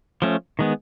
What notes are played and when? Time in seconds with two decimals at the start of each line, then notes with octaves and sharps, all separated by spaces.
0.22 F3 A3 C#4
0.59 D#3 G#3 B3